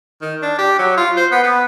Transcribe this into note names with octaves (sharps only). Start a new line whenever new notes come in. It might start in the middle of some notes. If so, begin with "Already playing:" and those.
D#3
D4
G4
F#3
F4
C5
B3
B3